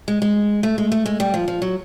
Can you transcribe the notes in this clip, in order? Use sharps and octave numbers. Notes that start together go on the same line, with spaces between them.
G#3
G#3
A3
G#3
A3
G#3
G3
F3
F3
F#3